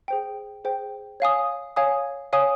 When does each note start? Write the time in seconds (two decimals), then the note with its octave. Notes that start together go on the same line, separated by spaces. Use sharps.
0.08 G#4 C5 G5
0.64 G#4 C5 G5
1.20 C#5 F5 G#5 D#6
1.76 C#5 F5 G#5 D#6
2.33 C#5 F5 G#5 D#6